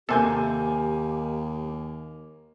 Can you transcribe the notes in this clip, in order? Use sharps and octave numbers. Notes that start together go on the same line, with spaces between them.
D#2 C3 A#3 G4 A4 G#5 G6